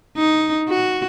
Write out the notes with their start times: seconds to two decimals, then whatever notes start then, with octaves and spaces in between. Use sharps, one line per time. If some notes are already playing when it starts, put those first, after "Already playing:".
0.17 D#4
0.70 F#4